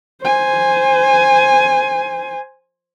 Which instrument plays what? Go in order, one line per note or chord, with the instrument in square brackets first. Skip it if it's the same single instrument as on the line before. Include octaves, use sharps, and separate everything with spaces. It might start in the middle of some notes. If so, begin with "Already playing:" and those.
[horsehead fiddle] C5 G#5